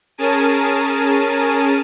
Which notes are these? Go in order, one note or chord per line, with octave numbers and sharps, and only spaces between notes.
C#4 G#4 A#4 A5 D#7